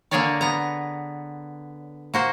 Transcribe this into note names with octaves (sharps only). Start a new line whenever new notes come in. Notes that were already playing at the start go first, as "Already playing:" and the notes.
D3 A#3 G#4 A#4 C#5 D5
B3 A#5
A#3 F#4 C5